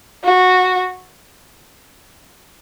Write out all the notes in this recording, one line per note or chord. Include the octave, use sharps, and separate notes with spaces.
F#4